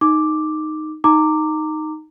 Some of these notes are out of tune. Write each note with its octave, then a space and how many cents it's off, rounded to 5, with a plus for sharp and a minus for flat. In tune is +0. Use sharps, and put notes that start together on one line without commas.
D#4 -5 D6 +0
D#4 +0 A#5 -25 D6 +0